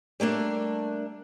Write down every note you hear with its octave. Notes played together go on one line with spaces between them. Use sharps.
G3 A3 A#3 D4